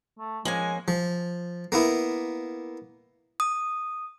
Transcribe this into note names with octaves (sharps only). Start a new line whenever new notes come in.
A3
F3 G#3 A#3 C#4 G#5
F3
A#3 B3 E4
D#6